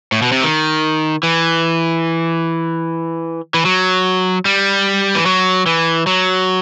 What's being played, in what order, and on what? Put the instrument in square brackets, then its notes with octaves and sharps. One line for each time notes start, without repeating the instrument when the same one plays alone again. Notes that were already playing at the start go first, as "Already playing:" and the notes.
[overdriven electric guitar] A2
B2
C3
D#3
E3
E3
F#3
G3
E3
F#3
E3
F#3